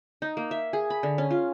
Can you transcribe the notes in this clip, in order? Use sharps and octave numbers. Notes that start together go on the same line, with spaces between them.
D#4
A#3
E5
G#4
B5
D3
C#4
F4